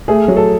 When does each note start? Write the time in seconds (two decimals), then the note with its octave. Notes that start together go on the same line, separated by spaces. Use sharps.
0.08 A3 G#4
0.28 F#3
0.37 A4